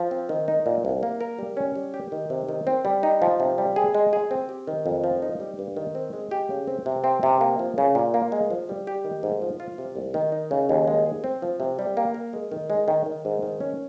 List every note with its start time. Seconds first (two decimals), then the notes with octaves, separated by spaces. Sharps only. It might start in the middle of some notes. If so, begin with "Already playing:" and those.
Already playing: F3
0.11 C4
0.29 D#3
0.48 D#4
0.66 A#2
0.85 C2
1.03 A#3
1.21 A#4
1.39 G3
1.57 C#4
1.75 G3
1.94 G4
2.12 D#3
2.30 C3
2.49 D#3
2.67 C4
2.85 G3
3.03 D#4
3.22 F3
3.40 C3
3.58 G3
3.76 G#4
3.95 G#3
4.13 G#4
4.31 C4
4.49 G4
4.67 D#3
4.86 F2
5.04 F3
5.22 D#4
5.40 G3
5.59 G2
5.77 D#3
5.95 C4
6.13 G#3
6.31 G4
6.50 C#3
6.68 C4
6.86 C3
7.04 C4
7.23 C3
7.41 A#3
7.59 F3
7.78 C#3
7.95 A#2
8.14 A#3
8.32 G#3
8.50 F3
8.69 G3
8.87 G4
9.05 D#3
9.23 G#2
9.42 F3
9.60 F4
9.78 C3
9.96 C2
10.14 D#3
10.32 D#4
10.51 C#3
10.69 D#2
10.88 G#3
11.06 G#4
11.24 C4
11.42 F3
11.60 C3
11.79 G3
11.97 A#3
12.14 A#4
12.33 G#3
12.51 D#3
12.70 G#3
12.88 D#3
13.06 D#3
13.25 G#2
13.43 D#3
13.60 C#4